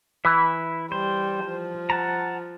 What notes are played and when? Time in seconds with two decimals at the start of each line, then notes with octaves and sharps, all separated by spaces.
0.25 E3 E4 B4 E5
0.92 G3 C5
1.46 F3
1.90 F#5 A5 A#5